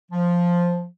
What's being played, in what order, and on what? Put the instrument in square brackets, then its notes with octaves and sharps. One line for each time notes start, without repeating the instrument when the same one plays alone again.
[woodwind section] F3